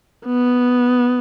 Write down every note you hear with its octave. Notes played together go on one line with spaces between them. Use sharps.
B3